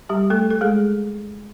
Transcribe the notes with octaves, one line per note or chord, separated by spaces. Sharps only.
G3 G4
A3 A4
A4
G#3 G#4